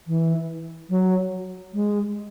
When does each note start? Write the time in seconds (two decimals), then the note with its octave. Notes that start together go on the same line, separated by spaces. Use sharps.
0.07 E3
0.90 F#3
1.74 G#3